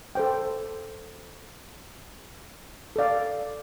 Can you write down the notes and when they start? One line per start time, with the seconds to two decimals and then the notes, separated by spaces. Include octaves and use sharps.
0.15 A4 C5 G5
2.96 A4 D5 F5